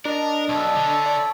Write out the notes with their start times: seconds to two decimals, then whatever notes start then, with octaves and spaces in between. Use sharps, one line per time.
0.05 D4 A#4 D#5
0.49 B1 A4 C#5 E5
0.76 D3
1.06 D5